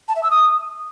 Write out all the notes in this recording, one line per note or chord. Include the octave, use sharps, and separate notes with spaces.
A5
E5
E6
D#6